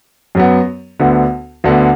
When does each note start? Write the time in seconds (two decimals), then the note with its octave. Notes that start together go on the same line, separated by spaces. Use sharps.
0.35 F#2 F#3 B3
1.00 D2 D3 B3
1.64 D2 D3 B3